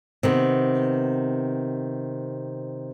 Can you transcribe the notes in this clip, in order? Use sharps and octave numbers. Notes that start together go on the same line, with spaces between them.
C3 D#3 B3